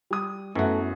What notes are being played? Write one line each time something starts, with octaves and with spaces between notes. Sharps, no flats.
G3 D#6
F#2 E3 A3 B3 F#4